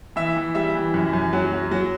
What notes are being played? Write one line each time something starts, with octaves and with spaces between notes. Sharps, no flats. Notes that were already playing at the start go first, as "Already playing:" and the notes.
E3 E5
E3
G3 E5
E3
F#2
F#2
F#3
F#3
F#3